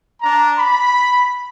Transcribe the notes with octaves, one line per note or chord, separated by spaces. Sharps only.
D4 A#5
B5